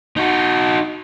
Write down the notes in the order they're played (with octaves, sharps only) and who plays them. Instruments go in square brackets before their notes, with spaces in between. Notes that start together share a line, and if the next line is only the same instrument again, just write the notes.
[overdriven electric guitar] D#4 F#4